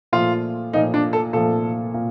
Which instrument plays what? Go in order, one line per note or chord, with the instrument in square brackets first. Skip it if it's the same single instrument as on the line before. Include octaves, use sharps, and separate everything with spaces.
[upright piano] A#2 F3 A3 [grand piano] F4
[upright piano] A#2 F3 A3 [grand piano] D#4
[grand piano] D4
A4
[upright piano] A#2 F3 A3 [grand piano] A4
[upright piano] A#2